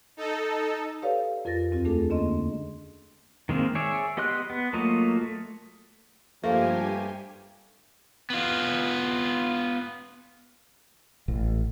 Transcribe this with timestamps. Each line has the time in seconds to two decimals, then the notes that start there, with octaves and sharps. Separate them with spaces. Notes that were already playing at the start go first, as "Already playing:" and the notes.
0.17 D#4 A4
1.02 G4 A4 B4 C#5 D5 F5
1.45 F2 F4 A#4 A6 A#6
1.71 D#2 C4 F4 F#4
1.85 G#3 A3 D4 G#4 A4
2.10 D3 A#3 C#4 D#5 C6
3.49 D#3 G#3 A#3 C4
3.75 G#4 C#5 D5 E5
4.17 B3 G4 D#5 C6 F#6
4.50 B3
4.73 F#3 A3 A#3 F4 D#5
5.21 A3
6.44 G2 F3 A3 A#3 G4 G#5
8.30 B3 F4
11.28 A1